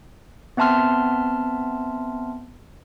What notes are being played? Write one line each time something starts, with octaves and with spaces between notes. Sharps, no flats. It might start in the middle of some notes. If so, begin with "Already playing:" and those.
B3 C4 E5 A5 C6 F6